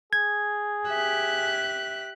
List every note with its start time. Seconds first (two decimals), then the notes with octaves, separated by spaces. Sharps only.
0.13 G#4 G#6
0.87 G4 E5 F#6